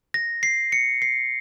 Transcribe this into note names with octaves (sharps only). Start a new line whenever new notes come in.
A#6
C7
C#7
C7